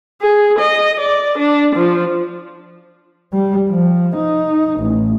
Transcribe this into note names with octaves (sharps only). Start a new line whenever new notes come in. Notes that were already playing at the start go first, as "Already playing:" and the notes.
G#4
D#5
D5
D4
F3
G3
F3
D#4
A1